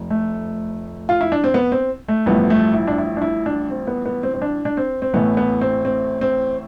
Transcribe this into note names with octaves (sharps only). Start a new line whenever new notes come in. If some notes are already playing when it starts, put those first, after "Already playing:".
Already playing: F1 F2
A3
F4
E4
D4
C4
B3
C4
A3
A1 G2 F3 A3 B3
A3
E4
D4
E4
D4
E4
D4
C4
B3
B3
C4
C4
D4
D4
C4
C4
A1 A2 E3 A3 B3
B3
C4
C4
C4